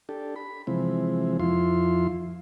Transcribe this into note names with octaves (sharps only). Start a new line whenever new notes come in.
D4 G4 A4
B5
C3 E3 F3 G#3 C4
F2 F3 E4 F4 C6